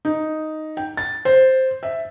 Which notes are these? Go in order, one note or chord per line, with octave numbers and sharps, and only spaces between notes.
D#4
G5
A6
C5
E5